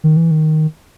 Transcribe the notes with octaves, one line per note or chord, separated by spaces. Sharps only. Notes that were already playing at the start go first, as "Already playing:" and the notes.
D#3
E3
D#3